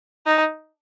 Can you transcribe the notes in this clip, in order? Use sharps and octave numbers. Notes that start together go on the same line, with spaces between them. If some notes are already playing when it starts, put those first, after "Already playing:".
D#4